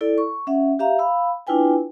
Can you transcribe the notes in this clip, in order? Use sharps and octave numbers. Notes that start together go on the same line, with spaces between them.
E4 A4 D5
C#6
C#4 E5 F#5
G4 E5 F5 A#5
F5 B5 E6
D4 E4 F4 B4 G5 G#5